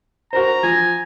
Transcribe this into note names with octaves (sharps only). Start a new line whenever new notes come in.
F#4 A#4 C5 A#5
F3 G#5